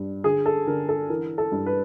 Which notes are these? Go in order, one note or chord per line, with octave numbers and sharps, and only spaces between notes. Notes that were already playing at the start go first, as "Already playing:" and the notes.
Already playing: G2
D3 G#4
A4
D3 A#4
A4
E3 A#4
A4
G2
B4